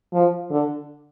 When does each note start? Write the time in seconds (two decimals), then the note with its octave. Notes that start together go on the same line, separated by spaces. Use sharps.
0.13 F3
0.50 D3